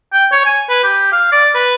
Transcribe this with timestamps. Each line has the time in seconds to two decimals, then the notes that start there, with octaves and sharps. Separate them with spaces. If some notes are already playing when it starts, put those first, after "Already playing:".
0.13 G5
0.32 C#5
0.45 G#5
0.69 B4
0.83 G4
1.12 F5
1.32 D5
1.55 B4